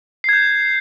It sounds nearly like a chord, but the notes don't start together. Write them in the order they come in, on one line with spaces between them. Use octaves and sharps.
C7 G#6 G6